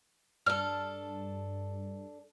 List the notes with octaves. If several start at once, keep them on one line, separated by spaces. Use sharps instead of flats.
G2 D4 A4 F6